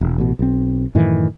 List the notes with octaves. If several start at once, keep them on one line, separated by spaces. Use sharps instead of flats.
E1
A1 B2
B1 C4
F#2 A2 D#3 E3